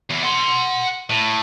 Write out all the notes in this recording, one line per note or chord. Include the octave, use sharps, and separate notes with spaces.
E2
F#5 C6
A2